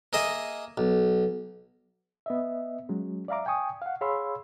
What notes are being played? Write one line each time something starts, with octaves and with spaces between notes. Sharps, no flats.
A#3 G#4 D#5 E5
B1
B3 D#5 E5
F#3 G#3 C#4
D5 E5 F5 A#5 D6
G5 G#5 C#6 D#6
F5 F#5
G#4 C#5 F5 B5 C6 E6